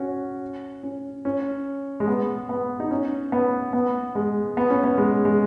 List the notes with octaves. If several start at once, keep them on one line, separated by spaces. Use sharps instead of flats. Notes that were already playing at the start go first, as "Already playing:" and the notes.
Already playing: C#4 F#4
C#4
C#4
G#3
B3
B3
D#4
C#4
B3
B3
G#3
B3
C#4
B3
G#3
G#3